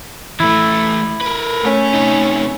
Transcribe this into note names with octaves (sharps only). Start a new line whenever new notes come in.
E3 A3 E4
A#4 B4
A3 C#4
C3 D#4